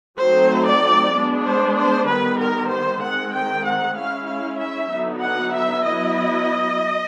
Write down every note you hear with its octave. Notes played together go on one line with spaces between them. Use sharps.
F#3 A3 C4 D#4 C5
D5
G#3 B3 D4
C5
C5
D#3 G3 B3 B4
A#4
C5
D#3 G#3 C4 F#5
G5
F#5
G#3 C#4 E4 F5
F5
E5
D3 F#3 B3 D#4
F#5
E5
F#3 B3 E4 D#5